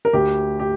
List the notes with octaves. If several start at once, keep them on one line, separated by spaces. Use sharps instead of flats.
A#4
D2 G4
G4